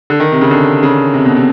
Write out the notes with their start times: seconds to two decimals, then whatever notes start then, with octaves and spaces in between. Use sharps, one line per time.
0.10 D3
0.20 D#3
0.32 C3
0.41 C#3
0.51 D3
0.83 C#3
1.14 C3
1.25 B2
1.37 C3